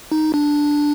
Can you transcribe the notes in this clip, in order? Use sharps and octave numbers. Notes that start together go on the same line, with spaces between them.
D#4
D4